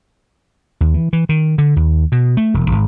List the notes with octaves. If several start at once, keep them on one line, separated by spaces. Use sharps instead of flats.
D#2
E3
E3
D#3
D3
D#2
B2
A3
E1
G#1